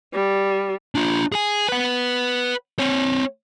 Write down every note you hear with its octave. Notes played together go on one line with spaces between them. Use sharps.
G3
D4 F4
G#4 G#5
B4 F#5
C4 C#5